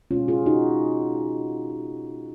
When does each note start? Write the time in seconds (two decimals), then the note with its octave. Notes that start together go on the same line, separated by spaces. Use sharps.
0.11 B2 G#3 C#4 F4
0.28 F4 G#4
0.46 D#4 F#4